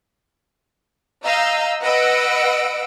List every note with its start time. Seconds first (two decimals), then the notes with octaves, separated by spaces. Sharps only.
1.24 D#5 F5 A#5 E6 G6
1.81 B4 D#5 F#5 E6 A#6 D7